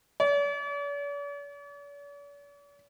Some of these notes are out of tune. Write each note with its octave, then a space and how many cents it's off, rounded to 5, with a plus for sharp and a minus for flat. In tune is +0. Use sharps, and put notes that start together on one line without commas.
D5 -45